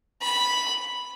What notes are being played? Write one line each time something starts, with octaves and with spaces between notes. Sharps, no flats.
B5